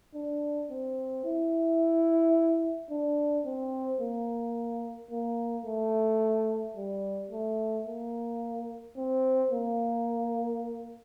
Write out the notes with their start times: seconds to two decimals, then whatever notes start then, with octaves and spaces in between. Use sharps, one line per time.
0.15 D4
0.71 C4
1.25 E4
2.90 D4
3.46 C4
4.01 A#3
5.11 A#3
5.66 A3
6.77 G3
7.31 A3
7.87 A#3
8.97 C4
9.52 A#3